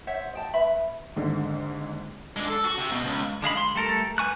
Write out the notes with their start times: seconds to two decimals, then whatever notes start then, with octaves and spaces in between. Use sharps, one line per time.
0.07 C5 C#5 E5 F#5
0.33 D#5 G5 A5
0.54 B4 E5 B5
1.16 G#1 D#2 G#2 D3
2.36 G#3 D4
2.48 A4
2.65 F#4
2.78 C3
2.92 B2
3.04 C#2
3.42 D3 G#3 F5 B5
3.57 C6
3.75 G3 A3 A4 A#4
4.18 B4 G#5 C#6 F#6